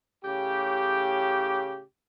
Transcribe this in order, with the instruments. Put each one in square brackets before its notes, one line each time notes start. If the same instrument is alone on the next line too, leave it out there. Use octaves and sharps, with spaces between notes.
[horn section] A2 C#3 G4